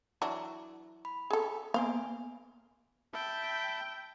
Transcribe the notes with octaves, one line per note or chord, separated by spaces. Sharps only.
E3 F#3 D4
B5
G#4 A4
A#3 B3 C5 F5 G#5
E5 G5 A5 B5